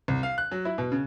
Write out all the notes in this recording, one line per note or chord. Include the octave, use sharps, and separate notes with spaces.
C2
F5
F#6
F#3
E4
B2
C#3